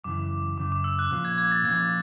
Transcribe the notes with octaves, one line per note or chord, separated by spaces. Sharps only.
F#2 C#3 E3 D6
F#2 C#3 D6
D6
E6
F#6
A#2 F3 A#3 C#4 F4 F#6
G#6
G#6
A6
A#2 F3 A#3 C#4 F4 G#6